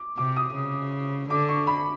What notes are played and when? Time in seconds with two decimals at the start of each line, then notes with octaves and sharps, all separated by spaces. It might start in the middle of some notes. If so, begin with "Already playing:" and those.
Already playing: D6
0.18 C3 D6
0.36 D#6
0.54 C#3
1.30 D3 D6
1.49 C#6
1.67 B5